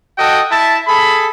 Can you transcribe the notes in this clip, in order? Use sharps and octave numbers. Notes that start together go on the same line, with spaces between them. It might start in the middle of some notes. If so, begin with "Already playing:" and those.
F#4 A4 D#5 G5
E4 E5 A5
G#4 A4 B5